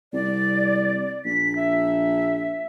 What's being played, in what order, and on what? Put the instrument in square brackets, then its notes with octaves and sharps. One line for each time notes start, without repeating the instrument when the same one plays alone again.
[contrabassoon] C2 [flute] D5
[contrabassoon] A#1 [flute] B6
[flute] E5